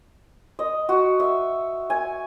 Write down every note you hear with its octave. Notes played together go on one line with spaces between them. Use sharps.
D#5
F#4
E5
G#5